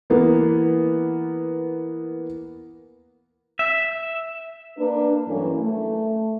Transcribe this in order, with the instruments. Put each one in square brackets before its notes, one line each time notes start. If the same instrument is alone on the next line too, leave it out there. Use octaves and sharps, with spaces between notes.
[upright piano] E3 A#3 B3
[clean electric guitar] E5
[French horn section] A#3 D4 B4
G2 E3 F#3 A3 A#3 C#4
A3